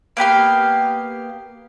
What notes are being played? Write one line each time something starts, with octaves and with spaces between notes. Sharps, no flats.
A#3 B3 G4 F5